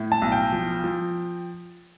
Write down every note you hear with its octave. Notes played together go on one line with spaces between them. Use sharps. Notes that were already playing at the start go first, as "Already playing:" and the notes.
Already playing: A2
A5
B1
G5
F3
F3